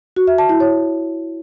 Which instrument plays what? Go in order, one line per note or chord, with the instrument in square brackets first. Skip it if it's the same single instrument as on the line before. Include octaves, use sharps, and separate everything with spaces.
[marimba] F#4
E5
A5
E4
C#5